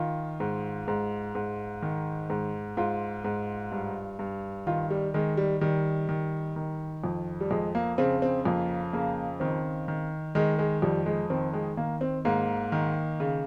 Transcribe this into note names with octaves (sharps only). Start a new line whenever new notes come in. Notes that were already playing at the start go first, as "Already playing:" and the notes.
Already playing: D#3 F4
G#2
G#2
G#2
D#3
G#2
G#2 F4
G#2
G2
G2
D#3 F4
G3
D#3 G#3
G3
D#3 G3
D#3
D#3
F2
G3
F2 G#3
A#3
C#3 C4
C4
F2 A#3
C#3 A#3
D#3 C4
D#3
D#3 G#3
G#3
F2 G3
G#3
D#3 C4
G#3
D#3 A#3
C4
G#2 A#3
D#3
C#3